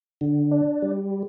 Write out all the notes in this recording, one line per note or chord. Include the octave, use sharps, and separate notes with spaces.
D3
D4
G3